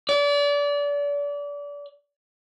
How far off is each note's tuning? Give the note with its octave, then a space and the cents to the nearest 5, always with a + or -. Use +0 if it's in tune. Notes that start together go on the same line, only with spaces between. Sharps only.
D5 -30